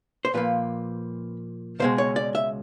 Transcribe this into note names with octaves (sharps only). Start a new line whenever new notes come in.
C5
A#2 F3 A#3 B4
C#2 B2 G#3 C5
C#5
D5
E5